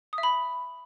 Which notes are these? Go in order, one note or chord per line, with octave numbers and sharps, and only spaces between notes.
D#6
E5
B5